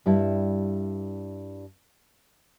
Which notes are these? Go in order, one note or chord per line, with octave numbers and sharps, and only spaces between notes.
G2 G3 E4 A5